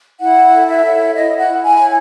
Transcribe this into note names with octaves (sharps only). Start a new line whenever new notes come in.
E4 F#5
A4
E5
C#5
E4 D#5
F#5
E4
G#5
C#5